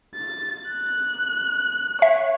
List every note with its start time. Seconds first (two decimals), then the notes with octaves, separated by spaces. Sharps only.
0.16 A6
0.68 F#6
2.02 C#5 E5